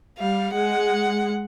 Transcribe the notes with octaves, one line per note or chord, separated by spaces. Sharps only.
G3 F5
G#3 F#5